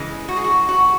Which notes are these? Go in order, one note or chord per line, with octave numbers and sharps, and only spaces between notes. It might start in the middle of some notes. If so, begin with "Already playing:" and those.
Already playing: C#3 E3 G#3
F#4
G#4
F#4
F#4